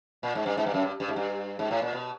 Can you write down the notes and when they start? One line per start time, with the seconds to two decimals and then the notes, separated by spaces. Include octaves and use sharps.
0.23 A#2
0.35 G#2
0.46 G2
0.57 G#2
0.66 G2
0.74 F#2
0.82 G2
1.00 G2
1.08 G#2
1.16 G2
1.59 G#2
1.71 A2
1.82 A#2
1.93 B2